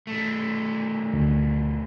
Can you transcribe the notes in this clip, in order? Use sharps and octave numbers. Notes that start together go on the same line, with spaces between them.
B1 A3
D2